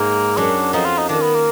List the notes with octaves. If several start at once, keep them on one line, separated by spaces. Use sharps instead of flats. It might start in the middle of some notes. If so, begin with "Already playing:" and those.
Already playing: G#2 G#3 A#3
F#2 F#3 D4
F2 F3 D#4
F4
D#4
D#3 D4
B3
A#3